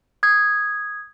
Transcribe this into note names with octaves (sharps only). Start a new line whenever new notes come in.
D#6 G#6